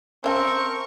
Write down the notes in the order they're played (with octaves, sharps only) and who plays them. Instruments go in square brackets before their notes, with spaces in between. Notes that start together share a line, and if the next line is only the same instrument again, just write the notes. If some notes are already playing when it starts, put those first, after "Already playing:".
[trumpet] C4 [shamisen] C#4 E5 A5 [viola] A#4 C#6